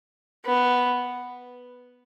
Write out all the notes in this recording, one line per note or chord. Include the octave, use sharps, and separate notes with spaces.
B3